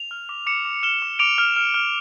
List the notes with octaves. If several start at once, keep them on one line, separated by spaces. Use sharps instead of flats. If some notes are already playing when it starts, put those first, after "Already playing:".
Already playing: F7
F6
D6
D6 C#7 E7
D6
F6 E7 G7
D6
D6 D7 F7
F6
F6
F6